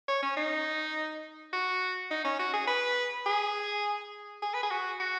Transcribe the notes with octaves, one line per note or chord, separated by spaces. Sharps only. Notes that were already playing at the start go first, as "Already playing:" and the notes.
C#5
C#4
D#4
F#4
D#4
C#4
F#4
G#4
B4
G#4
G#4
B4
G#4
F#4
F#4